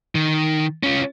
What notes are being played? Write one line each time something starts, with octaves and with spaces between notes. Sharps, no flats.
D#3
C#4 F4